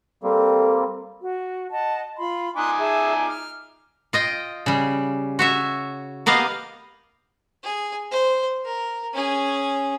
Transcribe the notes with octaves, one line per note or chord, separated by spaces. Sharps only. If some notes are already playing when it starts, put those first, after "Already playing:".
G3 A#3 C4 A4
F#4
D#5 F#5 A5
F4 B5 C6
D#4 G#5 C6 D6 D#6 F#6
G#4 E5 A5
F6
F4 D#5 G5
C#3 G3
F#4 C#5 E5
A#3 B3 G4 D#5 F5
G#4
C5
A#4
C#4 G#4